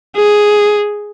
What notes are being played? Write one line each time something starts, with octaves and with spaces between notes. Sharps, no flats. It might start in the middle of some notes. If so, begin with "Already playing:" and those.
G#4